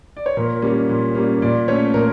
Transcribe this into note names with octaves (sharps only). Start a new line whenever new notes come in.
D5
C#5
A#2 A#4
G3 A#3 C#4
A#2
G3 A#3 C#4
A#2 D5
A3 C#4 C#5
A#2 A#4